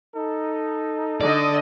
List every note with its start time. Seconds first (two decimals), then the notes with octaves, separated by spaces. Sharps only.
0.15 D#4 A4
1.21 D3 D5 D#5